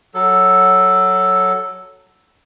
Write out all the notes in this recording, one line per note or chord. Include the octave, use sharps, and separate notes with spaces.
F#3 A4